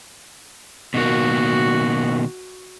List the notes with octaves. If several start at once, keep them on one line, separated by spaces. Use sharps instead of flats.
B2 D#3 A#3 F#4